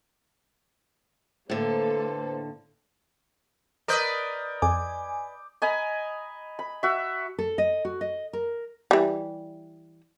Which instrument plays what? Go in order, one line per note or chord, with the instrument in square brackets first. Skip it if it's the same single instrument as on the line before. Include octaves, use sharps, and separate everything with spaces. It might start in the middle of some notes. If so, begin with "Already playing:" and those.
[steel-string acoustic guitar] A2 D3 [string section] A#3 A4 [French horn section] B4 C5
[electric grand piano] A#4 D#6 G6 [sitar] B4 D5 D#5
[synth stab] F2 [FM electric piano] G#5 [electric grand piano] D6
[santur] D#5 G#5 A#5 B5
B5
F#4 E5
[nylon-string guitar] A4
D#5
F#4
D#5
A#4
[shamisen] E3 G3